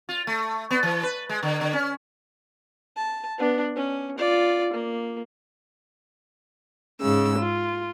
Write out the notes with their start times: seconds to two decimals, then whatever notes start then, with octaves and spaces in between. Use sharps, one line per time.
0.09 F4
0.27 A3
0.71 B3
0.83 E3
1.03 B4
1.29 G#3
1.43 D3
1.61 D3
1.73 C#4
2.96 A5
3.38 B3 D4
3.76 C#4
4.18 F4 D5
4.73 A#3
7.01 G#2 C#3 E6
7.38 F4